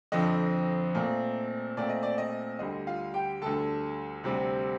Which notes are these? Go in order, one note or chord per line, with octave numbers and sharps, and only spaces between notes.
F2 D3 F3 C4 D#5
A#2 A3 C4
A#2 A3 C4 D5
D#5
D5
D#5
D2 D3 G3 D#5
F4 F5
G4 G5
D2 D3 G3 A4 A5
D2 C3 G3 C4